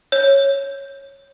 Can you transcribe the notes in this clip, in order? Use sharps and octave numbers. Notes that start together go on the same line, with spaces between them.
C#5